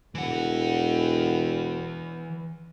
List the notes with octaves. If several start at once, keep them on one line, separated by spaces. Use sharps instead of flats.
E1 E3 F#5